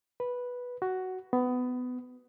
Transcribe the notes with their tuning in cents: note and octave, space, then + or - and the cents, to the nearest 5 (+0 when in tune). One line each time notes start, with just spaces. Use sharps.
B4 -5
F#4 +10
B3 +20